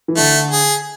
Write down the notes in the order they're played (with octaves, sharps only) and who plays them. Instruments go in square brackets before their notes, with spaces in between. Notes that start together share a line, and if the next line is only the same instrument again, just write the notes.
[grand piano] E3
[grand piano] D3 [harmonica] A3
[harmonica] G#4